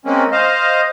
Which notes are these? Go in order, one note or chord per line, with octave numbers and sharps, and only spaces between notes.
G#3 A#3 C4 C#4
C5 D#5 F5